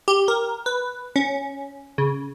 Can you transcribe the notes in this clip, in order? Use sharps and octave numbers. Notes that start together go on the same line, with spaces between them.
G4
A#4
B4
C#4
C#3